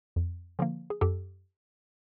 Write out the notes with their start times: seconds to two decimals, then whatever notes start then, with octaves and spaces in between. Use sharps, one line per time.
0.16 F2
0.59 D3 F3 A#3
0.90 G#4
1.01 F#2 G4 A4